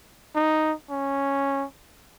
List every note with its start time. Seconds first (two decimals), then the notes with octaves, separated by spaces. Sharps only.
0.35 D#4
0.90 C#4